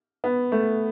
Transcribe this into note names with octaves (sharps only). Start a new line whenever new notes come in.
B3
A3